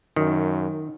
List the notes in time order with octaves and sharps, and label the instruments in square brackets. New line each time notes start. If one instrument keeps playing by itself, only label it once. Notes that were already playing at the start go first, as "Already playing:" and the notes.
[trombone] F#2 [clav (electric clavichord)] D#3